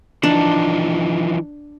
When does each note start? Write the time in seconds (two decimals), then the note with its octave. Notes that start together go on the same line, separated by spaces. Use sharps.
0.23 E3 F3 D4 D#4